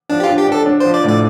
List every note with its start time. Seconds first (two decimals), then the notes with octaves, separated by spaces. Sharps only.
0.09 F3 D4
0.20 G4
0.23 F4
0.29 D4
0.37 G4
0.47 D4 A4
0.66 D4
0.80 F3 C5
0.94 D5
1.04 A2 D5